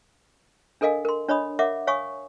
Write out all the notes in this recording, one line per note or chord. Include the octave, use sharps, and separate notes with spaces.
D4 A4 A#4 D#5 F5 G#5
A#4 C6
D4 C#5 D#5 B5 D#6
A#4 C#5 E5 F#5 D6
C#5 F5 G#5 C#6 D#6